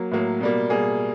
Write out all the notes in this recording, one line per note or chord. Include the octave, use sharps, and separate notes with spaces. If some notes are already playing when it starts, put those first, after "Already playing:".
Already playing: F#3 A#3
A2 F#3 A#3
B2 G3 A#3
B2 G3 A#3 G#4